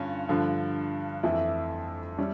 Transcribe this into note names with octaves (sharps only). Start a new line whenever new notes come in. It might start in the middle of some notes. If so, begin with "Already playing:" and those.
Already playing: G2 D3 C#4 F4
G2 D3 F3
F2 E3 A3 E4
G3 C#4 E4